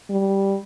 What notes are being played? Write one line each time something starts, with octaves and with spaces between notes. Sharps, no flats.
G3